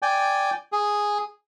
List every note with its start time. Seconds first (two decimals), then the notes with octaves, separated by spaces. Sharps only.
0.02 D5 G5 G#5
0.72 G#4